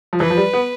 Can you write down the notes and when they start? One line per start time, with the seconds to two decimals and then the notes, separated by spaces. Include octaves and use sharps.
0.13 F3
0.20 E3 B4
0.30 F3
0.37 G3
0.53 B3